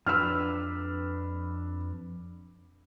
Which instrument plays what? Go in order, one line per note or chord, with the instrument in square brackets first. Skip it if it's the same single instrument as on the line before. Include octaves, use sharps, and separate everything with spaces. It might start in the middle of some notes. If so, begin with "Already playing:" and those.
[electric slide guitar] F2 D4 B4 [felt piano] E6 F6